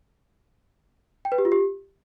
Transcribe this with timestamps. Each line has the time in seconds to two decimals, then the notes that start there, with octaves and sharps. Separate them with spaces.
1.25 G5
1.32 B4
1.38 G4
1.45 F4
1.52 G4